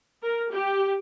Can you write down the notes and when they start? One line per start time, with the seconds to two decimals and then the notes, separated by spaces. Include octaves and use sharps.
0.23 A#4
0.52 G4